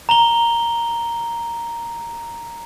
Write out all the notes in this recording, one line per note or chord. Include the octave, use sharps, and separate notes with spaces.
A#5 F7 G7